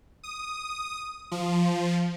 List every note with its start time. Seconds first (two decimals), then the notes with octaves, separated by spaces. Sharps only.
0.23 D#6
1.32 F3